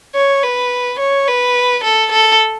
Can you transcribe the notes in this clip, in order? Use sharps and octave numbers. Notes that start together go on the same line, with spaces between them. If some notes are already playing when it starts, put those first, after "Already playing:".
C#5
B4
C#5
B4
A4
A4